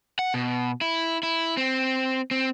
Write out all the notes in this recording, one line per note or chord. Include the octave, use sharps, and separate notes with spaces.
F#5
B2
E4
E4
C4
C4